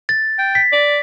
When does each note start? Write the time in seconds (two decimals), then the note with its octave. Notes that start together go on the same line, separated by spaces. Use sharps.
0.09 A6
0.39 G5
0.55 B6
0.73 D5